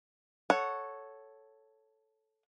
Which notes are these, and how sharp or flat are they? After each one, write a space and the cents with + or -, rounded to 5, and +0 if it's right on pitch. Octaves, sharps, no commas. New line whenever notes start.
A4 -5 C#5 +0 F#5 +0